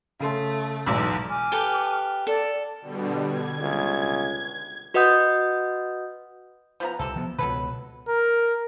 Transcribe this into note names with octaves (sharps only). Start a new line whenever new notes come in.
C#3 A3 A4 C6
B1 E2 G#2 D6 E6
G#5 D6 F6
G4 A4 B4
A4 D5
B2 D3 G3
G#6
C#2
F#4 B4 D#5 F#5 D#6 G6
F3 B3 A#5
C2 C3 F#3 A4
F3 B3
C#2 B2 F#3 A4 B4
A#4